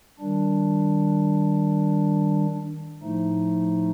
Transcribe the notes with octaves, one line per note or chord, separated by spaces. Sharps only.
D#3 G3 D4
A2 F3 A3 D#4